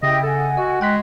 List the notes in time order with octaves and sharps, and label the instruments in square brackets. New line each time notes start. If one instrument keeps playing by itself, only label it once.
[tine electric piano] C#3 E5 A#6 [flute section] E4 G4 G5 [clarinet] D#5
[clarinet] A4 [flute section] F#5 G#5
[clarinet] F#4 [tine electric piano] D#5
[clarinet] G#3 [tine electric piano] G5 F#6 B6